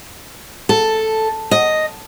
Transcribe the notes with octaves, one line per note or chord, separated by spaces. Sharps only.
A4
D#5